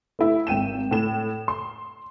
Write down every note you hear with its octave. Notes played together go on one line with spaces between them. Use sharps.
A3 E4
G#1 G5 D#7 E7
A2 E7
C6